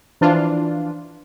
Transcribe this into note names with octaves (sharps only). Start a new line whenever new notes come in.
E3 F3 D4 F4